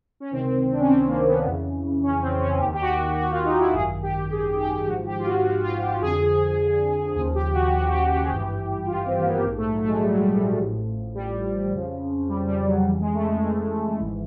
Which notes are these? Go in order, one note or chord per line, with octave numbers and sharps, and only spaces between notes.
C#4
C#2 C3 D#3 C4
D4
C#4
C4
A#3
B3
F2 C#3 E3
C#4
C4
C#4
D#2 D#3 G4
G4
F#4
G4
F#4
F4
D#4
E4
G#1 F#2 D#3 G#4
G4
G#4
G4
G#1 G#2 F3 F#4
G4
F4
F#4
F#4
F4
G4
F2 D3 F3 G#4
D#2 C#3 F3 G#4
G4
F#4
F#4
G4
G4
G#4
G#1 G2 E3 G4
F4
C4
A#3
B3
A#1 G#2 F3 A#3
A3
F#3
A3
G#3
G3
F#3
G3
A1 A2 F3
G3
F2 C#3 F3
G3
G3
F#3
F2 C#3 E3 G3
G#3
A3
G#3
G#3
G#1 G#2 E3